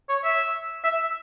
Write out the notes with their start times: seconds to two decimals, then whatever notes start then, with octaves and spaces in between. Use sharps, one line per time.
0.09 C#5
0.24 E5
0.84 E5